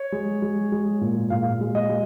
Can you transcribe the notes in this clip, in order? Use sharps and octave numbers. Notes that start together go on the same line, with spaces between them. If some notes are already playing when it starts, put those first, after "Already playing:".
Already playing: C#5
G#3
G#3
G#3
A#2
A#2 F5
G#3
D#5
G#3